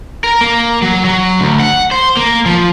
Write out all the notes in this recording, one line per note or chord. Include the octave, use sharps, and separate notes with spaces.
A#4
A#3
F#3
F#3
D2
F#5
C5
A#3
F3